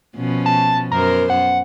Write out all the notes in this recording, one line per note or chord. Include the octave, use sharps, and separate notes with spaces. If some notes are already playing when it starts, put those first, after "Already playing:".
B2 F3 C#4
A5
F#2 B3 A#4 C5
F#5